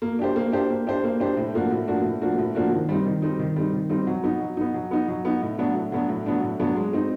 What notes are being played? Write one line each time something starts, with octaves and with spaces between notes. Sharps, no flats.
A#3
D4 G4 C5
A#3
D4 G4 C5
A#3
D4 G4 C5
A#3
D4 G4 C5
A2
F3 A#3 D4 F#4
A2
F3 A#3 D4 F#4
A2
F3 A#3 D4 F#4
A2
F3 A#3 D4 F#4
D#3
G3 C4 D#4
D#3
G3 C4 D#4
D#3
G3 C4 D#4
D#3
G3 C4 D#4
F#3
B3 D#4
F#3
B3 D#4
F#3
B3 D#4
F#3
B3 D#4
A2
F#3 B3 D4
A2
F#3 B3 D4
A2
F#3 B3 D4
A2
F#3 B3 D4
G#3
C4 D#4